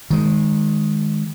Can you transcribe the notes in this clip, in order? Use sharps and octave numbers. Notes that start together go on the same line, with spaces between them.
D#3 G#3